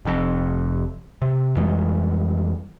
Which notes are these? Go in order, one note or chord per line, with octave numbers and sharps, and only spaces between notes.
F1 F2
C3
F2 E3 G3 G#3